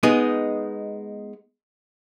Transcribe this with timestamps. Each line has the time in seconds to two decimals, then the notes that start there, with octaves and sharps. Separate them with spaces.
0.03 G#3 B3 D#4